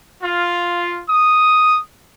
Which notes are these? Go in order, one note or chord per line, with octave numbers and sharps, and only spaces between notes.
F4
D#6